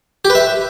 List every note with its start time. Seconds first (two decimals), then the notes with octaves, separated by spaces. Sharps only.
0.25 G4
0.30 B4
0.35 E5